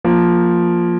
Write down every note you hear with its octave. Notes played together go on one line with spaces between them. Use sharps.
F3 A#3